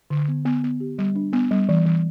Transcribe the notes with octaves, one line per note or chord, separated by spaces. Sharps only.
D3
B3
B3
B3
G4
G3
D4
B3
G3
E3
E3